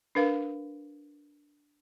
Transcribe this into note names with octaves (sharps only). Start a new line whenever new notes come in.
D4 A#4 B4 F5